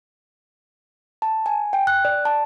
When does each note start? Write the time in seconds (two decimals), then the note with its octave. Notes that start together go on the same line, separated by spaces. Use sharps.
1.22 A5
1.46 G#5
1.73 G5
1.87 F#6
2.05 D5
2.25 A5